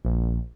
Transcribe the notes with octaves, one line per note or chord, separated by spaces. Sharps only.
A#1